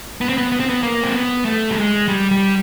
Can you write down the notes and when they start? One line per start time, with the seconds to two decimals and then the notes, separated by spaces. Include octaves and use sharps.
0.21 B3
0.29 C4
0.38 B3
0.52 B3
0.60 C4
0.69 B3
0.83 A#3
1.03 C4
1.14 B3
1.45 A3
1.71 G3
1.76 G#3
2.08 G3
2.31 G3